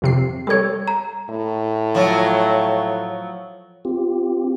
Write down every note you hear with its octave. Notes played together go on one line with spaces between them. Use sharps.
F2 C3 C7
G3 A4 C#5 E6 G#6
A#5
A2
F3 F#3
C4 F4 G4